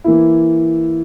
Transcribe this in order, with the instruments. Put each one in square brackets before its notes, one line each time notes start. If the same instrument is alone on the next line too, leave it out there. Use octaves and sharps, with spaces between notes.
[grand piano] E3 A#3 E4